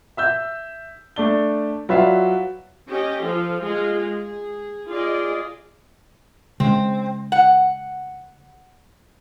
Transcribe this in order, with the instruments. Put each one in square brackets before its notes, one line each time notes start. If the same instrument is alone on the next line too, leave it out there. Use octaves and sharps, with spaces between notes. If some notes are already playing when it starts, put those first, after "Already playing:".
[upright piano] E5 E6 G6
A3 D4 G7
F#3 F4 B4 D5 E5 F5
[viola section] C#4 G4 D#5
F3 F4 A4
G#3 F4 G#4
G#4
F4 G#4 D5 D#5
[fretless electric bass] C#3 G#3 [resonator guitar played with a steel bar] C4
[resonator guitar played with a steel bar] F#5